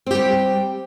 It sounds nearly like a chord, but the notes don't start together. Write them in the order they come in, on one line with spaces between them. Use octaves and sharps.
C4 G4 G3